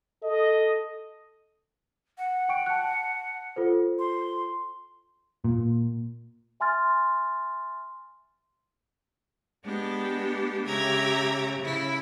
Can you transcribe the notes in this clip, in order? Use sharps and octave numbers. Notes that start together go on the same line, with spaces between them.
A4 D#5
F#5
G5 C#6 D7
A5 F#6
F4 A4 C5
C6
A#2
E5 G#5 C6 F6 A6
G#3 B3 D4 G4
C#3 G#3 G4 E5 A#5 G#6
C#3 E4